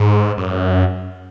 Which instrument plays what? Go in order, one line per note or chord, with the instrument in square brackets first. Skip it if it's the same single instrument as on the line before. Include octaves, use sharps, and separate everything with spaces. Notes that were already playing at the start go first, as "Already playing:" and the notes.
Already playing: [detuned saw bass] G#2
F#2